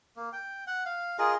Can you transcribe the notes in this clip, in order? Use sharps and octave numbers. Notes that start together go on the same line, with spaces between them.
A#3
G5
F#5
F5
F4 G#4 A#4 D#5